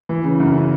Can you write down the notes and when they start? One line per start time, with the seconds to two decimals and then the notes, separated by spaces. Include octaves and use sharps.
0.09 E3
0.24 C#3
0.40 F#2
0.55 C#3